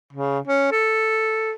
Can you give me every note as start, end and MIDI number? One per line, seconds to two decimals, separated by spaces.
0.13 0.39 49
0.47 0.71 61
0.71 1.53 69